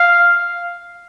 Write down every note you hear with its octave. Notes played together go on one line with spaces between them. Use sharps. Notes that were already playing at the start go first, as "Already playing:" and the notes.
Already playing: F5